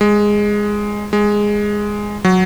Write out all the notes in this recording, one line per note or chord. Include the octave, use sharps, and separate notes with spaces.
G#3
G#3
F#3